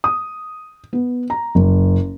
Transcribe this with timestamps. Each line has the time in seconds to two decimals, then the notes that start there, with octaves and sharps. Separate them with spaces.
0.04 D#6
0.93 B3
1.30 A#5
1.55 F#1